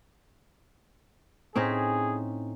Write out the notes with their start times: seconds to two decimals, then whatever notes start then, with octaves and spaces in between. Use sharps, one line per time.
1.56 A2 C4 C#4 D#4 G#4 A#6 B6